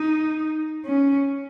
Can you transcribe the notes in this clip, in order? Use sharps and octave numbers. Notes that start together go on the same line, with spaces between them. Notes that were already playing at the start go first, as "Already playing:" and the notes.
Already playing: D#4
C#4